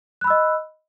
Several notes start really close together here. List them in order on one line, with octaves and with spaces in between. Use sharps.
F#6 B5 E6 D#5